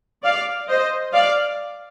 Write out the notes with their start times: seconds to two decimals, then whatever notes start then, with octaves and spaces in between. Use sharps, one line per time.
0.24 D5 F5
0.69 C5 D#5
1.13 D5 F5